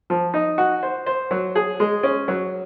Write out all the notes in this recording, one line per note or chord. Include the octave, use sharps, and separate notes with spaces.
F3
D#4
F#4
C5
C5
F#3
G#4
G#3
C#4
F#3